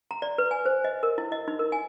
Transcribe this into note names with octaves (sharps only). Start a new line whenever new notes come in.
A#5
D5
B4
G#5
C5
D#5
A#4
E4
D#5
D#4
A#4
G#5